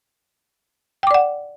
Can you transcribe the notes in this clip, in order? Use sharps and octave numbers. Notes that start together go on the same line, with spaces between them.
D5 F#5 G5 D6